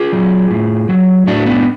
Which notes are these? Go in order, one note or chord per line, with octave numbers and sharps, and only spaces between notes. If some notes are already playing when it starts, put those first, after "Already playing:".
Already playing: F4 G#4
F#3
A2
F#3
A2 D4 F#4
B3 D4